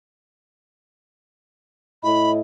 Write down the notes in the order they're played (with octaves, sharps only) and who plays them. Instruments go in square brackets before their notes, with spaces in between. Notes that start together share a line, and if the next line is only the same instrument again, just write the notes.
[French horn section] A2 E4 D#5 [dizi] B5